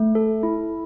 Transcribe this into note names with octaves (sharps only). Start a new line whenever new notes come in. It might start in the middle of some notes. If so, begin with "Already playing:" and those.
Already playing: A3
A4
E4